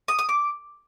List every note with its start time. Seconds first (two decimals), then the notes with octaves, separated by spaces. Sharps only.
0.08 D#6
0.19 D#6
0.29 D6